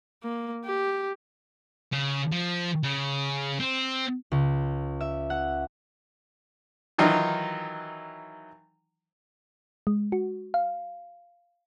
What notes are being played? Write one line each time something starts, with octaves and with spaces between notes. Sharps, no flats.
A#3
G4
C#3
F3
C#3
C4
C#2
E5
F#5
D#3 E3 F#3 D#4 F4
G#3
F#4
F5